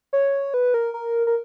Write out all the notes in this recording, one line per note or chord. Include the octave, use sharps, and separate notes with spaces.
C#5
B4
A#4
A#4
A#4